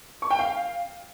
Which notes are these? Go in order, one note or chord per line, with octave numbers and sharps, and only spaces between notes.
C#6
G5
F5